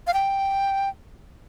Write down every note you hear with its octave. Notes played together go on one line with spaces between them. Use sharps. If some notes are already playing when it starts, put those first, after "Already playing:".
F5
G5